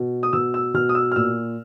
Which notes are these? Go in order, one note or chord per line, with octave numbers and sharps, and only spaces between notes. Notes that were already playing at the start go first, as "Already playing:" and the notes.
Already playing: B2
D#6
B2 E6
E6
B2 F6
D#6
E6
F6
A#2 E6